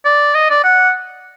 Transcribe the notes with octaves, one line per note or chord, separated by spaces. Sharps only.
D5
D#5
D5
F#5